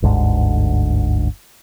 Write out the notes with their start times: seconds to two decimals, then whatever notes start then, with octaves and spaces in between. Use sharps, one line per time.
0.02 G1 D2 G#2 D3